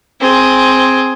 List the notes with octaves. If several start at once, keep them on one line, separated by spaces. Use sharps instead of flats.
C4 G#4